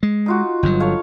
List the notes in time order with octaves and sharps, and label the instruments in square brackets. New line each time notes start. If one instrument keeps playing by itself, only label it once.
[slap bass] G#3
[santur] D#4 F4 F#4
[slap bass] G1 G2 F#3
[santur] A4 C#5 F5